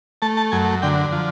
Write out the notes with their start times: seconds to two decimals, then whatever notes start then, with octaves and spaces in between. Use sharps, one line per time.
0.22 A3 A5
0.37 A5
0.52 F#2 G#5
0.82 D3 G5
1.12 F3